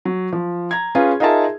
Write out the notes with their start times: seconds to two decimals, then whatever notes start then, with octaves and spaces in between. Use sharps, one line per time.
0.05 F#3
0.33 F3
0.71 A#5 G#6
0.95 C#4 F4 G#4 B4
1.20 D#4 F4 G#4 A#4 E5 A5